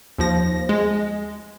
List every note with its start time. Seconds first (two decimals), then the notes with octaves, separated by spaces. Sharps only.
0.19 D#2 F3 A#6
0.69 G#3